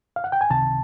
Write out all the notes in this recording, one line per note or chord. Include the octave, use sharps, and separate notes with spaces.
F5
F#5
G5
G#5
C#2 C3 D#3 A5